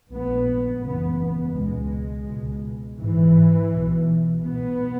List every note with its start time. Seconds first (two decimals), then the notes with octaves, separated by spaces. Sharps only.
0.11 A#1 A#2 B3
0.83 F#1 E2 C#3 B3
1.19 B3
1.54 C#2 B2 G#3
2.27 C#2 B2
2.99 G#1 G#2 E3
3.71 B1 B2
4.43 B1 B2 B3